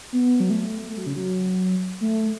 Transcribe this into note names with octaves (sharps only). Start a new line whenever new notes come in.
B3
F#3
A3
A3
F#3
C#3
F#3
A3